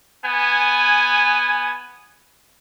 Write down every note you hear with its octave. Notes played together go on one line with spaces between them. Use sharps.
B3 G#5